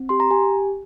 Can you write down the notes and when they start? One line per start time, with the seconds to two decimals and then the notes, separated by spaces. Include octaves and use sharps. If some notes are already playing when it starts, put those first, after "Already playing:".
Already playing: C4
0.09 G4 C6
0.20 A#5
0.31 G4 G#5